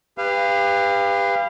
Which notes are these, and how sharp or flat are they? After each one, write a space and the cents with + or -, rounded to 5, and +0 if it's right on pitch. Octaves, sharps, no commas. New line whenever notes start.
G4 +30 B4 +10 F5 -20